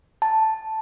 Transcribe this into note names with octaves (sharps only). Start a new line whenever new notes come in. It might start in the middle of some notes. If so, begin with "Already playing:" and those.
A5